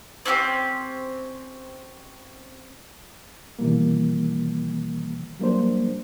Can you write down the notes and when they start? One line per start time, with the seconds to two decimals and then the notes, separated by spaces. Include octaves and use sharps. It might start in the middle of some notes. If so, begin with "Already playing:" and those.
0.25 C4 C#4 E4 G4
3.59 B2 D#3 E3 G3 A#3
5.39 F#3 G3 A#3 D4 C5